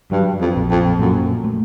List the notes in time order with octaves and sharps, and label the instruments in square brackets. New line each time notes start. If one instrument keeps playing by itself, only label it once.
[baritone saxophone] G2 [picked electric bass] F#3
[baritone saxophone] F2
[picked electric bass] A#1
[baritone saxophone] F2
[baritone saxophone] F#2 [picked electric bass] A#2
[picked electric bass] A3